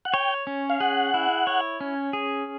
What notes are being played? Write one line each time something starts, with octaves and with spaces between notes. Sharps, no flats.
F#5
C#5 G5
C#4
F5
G#4 F#5
E4
C#5
C#4
G#4